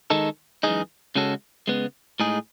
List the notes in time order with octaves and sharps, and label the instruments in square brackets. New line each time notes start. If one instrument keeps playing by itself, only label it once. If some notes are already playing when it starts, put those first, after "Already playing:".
[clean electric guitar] D#3 G#3 D#4 A4
F#2 E3 G#3 D#4 G#4
C#3 G#3 C#4 F#4 A4
C#3 G#3 B3
A2 G#3 D#4 G#4